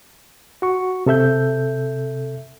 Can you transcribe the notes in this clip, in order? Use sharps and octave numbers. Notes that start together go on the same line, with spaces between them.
F#4 C#6
C3 A4 E5 G6